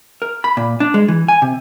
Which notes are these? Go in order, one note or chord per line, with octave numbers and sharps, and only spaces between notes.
A#4
B5
A#2
D4
G#3
E3
G#5
C3